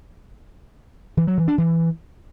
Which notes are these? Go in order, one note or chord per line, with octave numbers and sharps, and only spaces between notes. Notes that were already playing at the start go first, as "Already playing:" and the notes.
E3
F#3
E3
D4
E3